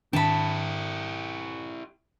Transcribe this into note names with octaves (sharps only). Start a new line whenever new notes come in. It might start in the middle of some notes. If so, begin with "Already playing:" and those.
G#2 D#3 D4 E4 G4 A5 B5